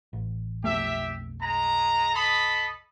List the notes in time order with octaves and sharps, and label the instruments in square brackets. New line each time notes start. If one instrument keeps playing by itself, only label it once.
[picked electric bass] A1
[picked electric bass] B1 F2 A3 [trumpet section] G4 E5
[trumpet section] G#3 A#5
A4 D#5 B5